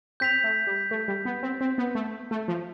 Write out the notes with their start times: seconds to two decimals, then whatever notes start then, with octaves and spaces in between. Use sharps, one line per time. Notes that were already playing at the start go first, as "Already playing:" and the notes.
0.20 C4 G6 B6 F7
0.44 A3
0.67 G3
0.91 A3
1.08 G3
1.25 B3
1.43 C4
1.61 C4
1.78 B3
1.95 A3
2.31 A3
2.48 F3